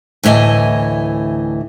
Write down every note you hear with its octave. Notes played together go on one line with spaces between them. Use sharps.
D2 A2 E3 D#5 G#5